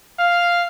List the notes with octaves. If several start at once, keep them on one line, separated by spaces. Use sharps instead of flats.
F5